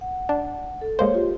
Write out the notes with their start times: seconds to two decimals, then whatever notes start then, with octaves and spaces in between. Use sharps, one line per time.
0.01 F#5
0.29 D4
0.81 A4
0.99 G#3 A#3 C5 C#5
1.14 F4 G4